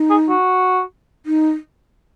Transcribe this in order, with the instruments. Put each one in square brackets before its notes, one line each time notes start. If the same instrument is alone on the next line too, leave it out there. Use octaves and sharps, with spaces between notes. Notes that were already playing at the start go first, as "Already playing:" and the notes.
Already playing: [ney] D#4
[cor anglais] G#4
F#4
[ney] D#4